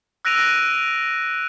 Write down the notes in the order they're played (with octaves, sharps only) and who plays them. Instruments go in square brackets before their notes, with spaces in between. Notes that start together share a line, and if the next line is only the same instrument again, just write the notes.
[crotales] E6 F#6 A#6 D7 D#7 F7